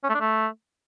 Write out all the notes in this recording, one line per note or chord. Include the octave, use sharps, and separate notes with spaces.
C#4
A3
D4
A3